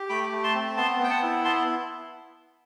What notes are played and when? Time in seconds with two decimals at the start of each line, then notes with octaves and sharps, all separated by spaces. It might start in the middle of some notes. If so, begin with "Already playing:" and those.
Already playing: G4
0.09 A3 G5 B5
0.32 A3
0.43 A5 C6
0.54 C4
0.77 B3 A5 C6
0.99 B3 G5
1.10 F#5 A5
1.23 E4
1.45 B3 A5 C6